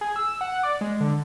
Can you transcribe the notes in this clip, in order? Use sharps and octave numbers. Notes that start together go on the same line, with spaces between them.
G#4
E6
F#5
D5
G#3
D3